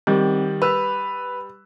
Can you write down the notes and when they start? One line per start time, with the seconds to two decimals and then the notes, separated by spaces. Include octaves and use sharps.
0.07 D#3 G3 C4
0.62 B4 B5 E6